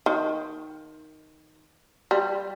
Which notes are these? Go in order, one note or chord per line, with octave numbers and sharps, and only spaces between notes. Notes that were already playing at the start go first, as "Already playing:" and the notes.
D#3
G3